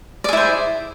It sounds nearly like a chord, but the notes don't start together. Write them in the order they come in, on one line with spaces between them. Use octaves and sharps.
D5 G#4 E4 C5